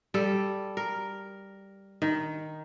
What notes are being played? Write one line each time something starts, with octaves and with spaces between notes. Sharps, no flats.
G3 A4
A#4
D#3